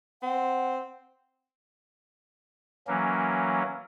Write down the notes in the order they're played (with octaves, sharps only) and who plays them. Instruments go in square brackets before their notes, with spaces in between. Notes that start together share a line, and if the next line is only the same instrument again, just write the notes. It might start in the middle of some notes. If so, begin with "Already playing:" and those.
[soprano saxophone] C4 [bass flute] F#5
[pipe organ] E3 F#3 A#3 C#4